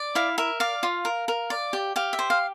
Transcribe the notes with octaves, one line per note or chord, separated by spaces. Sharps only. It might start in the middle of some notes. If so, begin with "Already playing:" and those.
Already playing: D5
E4 F5
A#4 E5
D5 F5
F4
A#4
A#4
D5
G4
G4 F5
E5
C5
F5